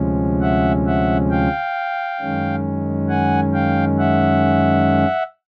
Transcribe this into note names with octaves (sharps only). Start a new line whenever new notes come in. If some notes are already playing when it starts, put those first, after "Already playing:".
Already playing: D2 C3 F3 G#3 C#4
E5 F#5
E5 F#5
F5 G5
F#2 D#3 G#3 C#4
F#5 G#5
F5 G5
E5 F#5